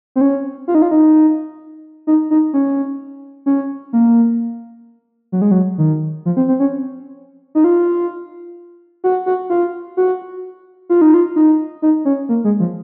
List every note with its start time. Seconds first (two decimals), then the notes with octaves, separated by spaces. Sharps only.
0.16 C4
0.21 C#4
0.68 F4
0.75 D#4
0.82 F4
0.91 D#4
2.07 D#4
2.30 D#4
2.53 C#4
3.46 C#4
3.93 A#3
5.32 F#3
5.42 G#3
5.51 F#3
5.78 D#3
6.25 F3
6.37 C4
6.48 C4
6.60 C#4
7.55 D#4
7.64 F4
9.04 F#4
9.26 F#4
9.50 F4
9.97 F#4
10.90 F4
11.01 D#4
11.14 F4
11.36 D#4
11.82 D#4
12.05 C#4
12.29 A#3
12.44 G#3
12.60 F3